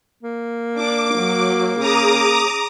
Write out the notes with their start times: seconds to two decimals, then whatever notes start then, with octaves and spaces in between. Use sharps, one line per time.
0.23 A#3
0.75 D4 D6
1.15 F#3
1.79 C#3 A#5 D6 D#6